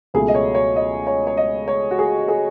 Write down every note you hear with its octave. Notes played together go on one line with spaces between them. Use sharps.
C#2 B2 F#3 A3 G#4
D#5
C#5
C#5
D#5
C#5
C#5
D#5
C#5
F#4
G#4
G#4